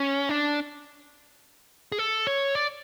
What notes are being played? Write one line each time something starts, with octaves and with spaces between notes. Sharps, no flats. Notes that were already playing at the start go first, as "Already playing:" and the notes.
Already playing: C#4
D4
G#4
A4
C#5
D5